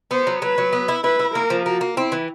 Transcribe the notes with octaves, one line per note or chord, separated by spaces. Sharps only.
B3 C5
F#3
F#3 B4
F#3
B3
E4
E4 B4
E4
A#3 A#4
F3
A#3 F#4
A#3
C4 E4
E3